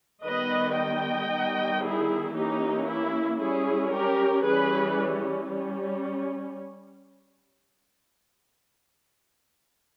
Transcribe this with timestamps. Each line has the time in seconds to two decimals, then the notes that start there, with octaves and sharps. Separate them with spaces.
0.24 D#3 G3 B3 B4 D#5
0.77 D#5 G5
1.30 D#3 G3 B3
1.82 E4 G#4
2.35 E3 A#3 C#4 D#4 G4
2.87 E4
3.39 G3 C#4 E4 G#4
3.92 G4 A#4
4.44 E3 G3 C#4 G#4 B4
5.49 G3 C#4